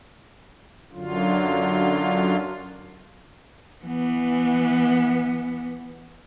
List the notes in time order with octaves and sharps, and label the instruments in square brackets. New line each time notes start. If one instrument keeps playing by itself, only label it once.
[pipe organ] F#2 D3 F#3 F4
[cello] E3 B3